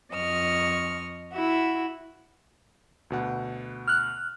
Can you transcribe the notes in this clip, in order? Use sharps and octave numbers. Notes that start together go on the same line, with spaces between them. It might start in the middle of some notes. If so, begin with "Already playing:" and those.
F2 D#5 C#6 F6
E4 F#4 E5
D2 B2 F#5
F6 F#6